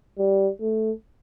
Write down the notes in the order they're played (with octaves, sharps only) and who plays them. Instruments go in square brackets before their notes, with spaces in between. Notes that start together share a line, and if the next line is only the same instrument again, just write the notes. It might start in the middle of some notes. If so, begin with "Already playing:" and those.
[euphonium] G3
A3